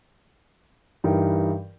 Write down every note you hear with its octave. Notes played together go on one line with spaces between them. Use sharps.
G2 E3 G3 D#4 A#4 G5